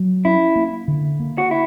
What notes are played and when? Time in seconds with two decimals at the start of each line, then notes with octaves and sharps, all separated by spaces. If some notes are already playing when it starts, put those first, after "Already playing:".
Already playing: F#3
0.25 C#4 E4
0.56 A#3
0.88 D3
1.20 A#3
1.38 F#4
1.51 E4